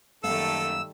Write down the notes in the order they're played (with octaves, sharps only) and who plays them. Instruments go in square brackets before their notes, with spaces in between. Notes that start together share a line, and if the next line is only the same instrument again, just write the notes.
[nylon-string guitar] F#2 A#3 F5 [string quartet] D#3 G3 A3 [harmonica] A4 [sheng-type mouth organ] E6